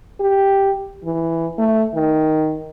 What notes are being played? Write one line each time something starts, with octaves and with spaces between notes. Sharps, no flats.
G4
E3
A3
D#3